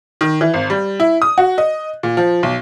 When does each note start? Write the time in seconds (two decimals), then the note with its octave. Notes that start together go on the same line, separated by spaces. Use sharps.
0.21 D#3
0.41 E3
0.54 G#1
0.70 G3
1.00 E4
1.22 D#6
1.38 F#4
1.58 D#5
2.03 A#2
2.17 F3
2.43 B1